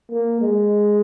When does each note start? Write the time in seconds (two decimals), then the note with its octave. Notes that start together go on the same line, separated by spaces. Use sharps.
0.11 A#3
0.41 G#3